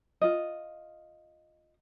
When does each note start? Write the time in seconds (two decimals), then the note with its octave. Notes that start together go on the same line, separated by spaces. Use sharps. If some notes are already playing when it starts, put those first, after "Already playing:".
0.22 F4 D#5